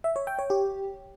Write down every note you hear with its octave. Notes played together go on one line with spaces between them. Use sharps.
E5
C#5
G5
C#5
G4